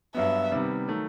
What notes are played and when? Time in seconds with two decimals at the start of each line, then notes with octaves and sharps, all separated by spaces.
0.15 G2 F#3 B3 E5
0.51 C3 D#3 G3 B3
0.88 D#3 F#3 A3